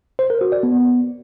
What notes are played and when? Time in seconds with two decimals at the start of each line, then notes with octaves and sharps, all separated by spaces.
0.19 C5
0.30 A#4
0.41 F#4
0.52 D5
0.63 B3